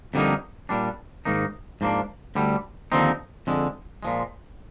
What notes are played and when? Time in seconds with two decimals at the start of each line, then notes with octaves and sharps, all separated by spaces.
0.14 F2 D3 G3 A#3 D#4
0.69 A#2 G3 D4
1.25 G#2 D#3 A#3 D#4
1.81 G#2 F3 A#3 D4
2.35 D2 D3 G3
2.92 D#2 D3 F3 C4 D#4
3.47 F2 D3 G#3
4.03 A#2 F3 G#3